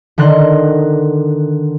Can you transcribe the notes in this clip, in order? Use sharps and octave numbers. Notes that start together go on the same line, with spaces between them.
D3 D#3 C6 F#6 A#6